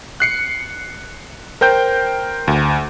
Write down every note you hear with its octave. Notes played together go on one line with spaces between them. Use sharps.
F#6 C7 C#7
A#4 C5 G5 G6
D2